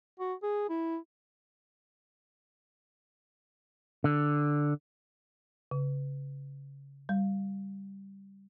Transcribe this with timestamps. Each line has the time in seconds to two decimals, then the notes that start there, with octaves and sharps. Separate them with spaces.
0.20 F#4
0.43 G#4
0.69 E4
4.04 D3
5.71 C#3
7.09 G3